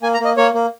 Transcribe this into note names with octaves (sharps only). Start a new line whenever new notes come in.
A#3 G#5
A#5
A#3 D#5
A#3 C#5
A#3